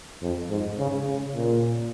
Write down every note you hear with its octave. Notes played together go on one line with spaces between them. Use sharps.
F2
G#2
C#3
C#3
A#2